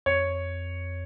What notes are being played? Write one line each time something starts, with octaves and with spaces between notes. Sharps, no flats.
F2 C#5